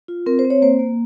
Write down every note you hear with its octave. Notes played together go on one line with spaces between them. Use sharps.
F4
C4 A#4
C5
C4
C#5
A#3 C5
A#3